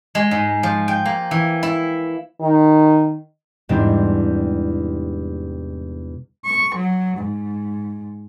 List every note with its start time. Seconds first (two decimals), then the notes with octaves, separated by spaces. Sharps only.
0.15 G#3
0.31 G#2
0.63 F3
0.88 G5
1.05 A#3
1.31 E3
1.63 E4
2.41 D#3
3.69 E2 G#2 C3 G3 C4 D4
6.44 C#6
6.75 F#3
7.17 G#2